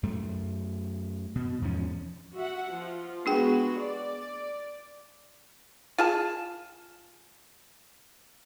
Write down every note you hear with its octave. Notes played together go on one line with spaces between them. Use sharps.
F#2 A3
B2
E2 G#2 F3 C#4
F#4 E5 F#5
F3 F4
G#3 B3 D4 F#4 G#4 G5
D5
F4 G#4 A5